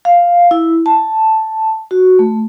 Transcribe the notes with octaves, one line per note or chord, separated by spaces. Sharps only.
F5
E4
A5
F#4
A3